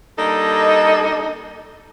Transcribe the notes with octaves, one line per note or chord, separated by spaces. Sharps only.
G3 A#3 D4 D#4 A4 D#5